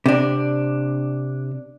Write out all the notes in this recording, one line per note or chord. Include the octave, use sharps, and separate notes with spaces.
C3 D4